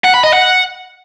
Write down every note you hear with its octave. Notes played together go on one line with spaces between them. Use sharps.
F#5
B5
D#5
F#5